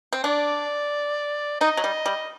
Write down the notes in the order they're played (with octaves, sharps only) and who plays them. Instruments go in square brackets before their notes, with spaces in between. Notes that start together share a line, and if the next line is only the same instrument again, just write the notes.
[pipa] C4
[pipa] D4 [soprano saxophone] D5
[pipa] D#4 [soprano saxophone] D#5
[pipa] F#3
G3
G3